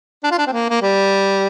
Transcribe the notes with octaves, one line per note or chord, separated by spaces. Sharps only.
D4
F4
D4
C4
A#3
A#3
G3